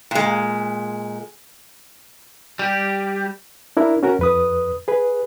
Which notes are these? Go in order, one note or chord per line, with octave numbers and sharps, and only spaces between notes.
A#2 G#3
G3 G4
D4 E4 A#4
C#4 F#4 A#4
F2 B4 D#6
G#4 B4